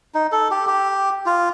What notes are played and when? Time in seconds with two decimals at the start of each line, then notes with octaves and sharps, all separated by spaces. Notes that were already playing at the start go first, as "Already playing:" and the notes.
0.14 D#4
0.32 A4
0.51 G4
0.67 G4
1.26 F4